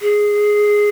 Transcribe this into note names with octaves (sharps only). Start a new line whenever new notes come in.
G#4